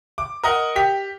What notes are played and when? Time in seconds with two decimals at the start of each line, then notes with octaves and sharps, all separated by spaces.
0.18 D6
0.43 A#4 D#5 F#5
0.76 G4 B6